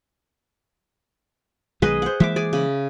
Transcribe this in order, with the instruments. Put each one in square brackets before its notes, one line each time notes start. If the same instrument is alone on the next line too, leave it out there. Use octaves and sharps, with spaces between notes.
[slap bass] B1 D#3 G#3 [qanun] G#4 B4 D#5
[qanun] C5 F#5
[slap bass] E3 G#3 A#3 [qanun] E5 D6
[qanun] G#4 D5
C#3 B5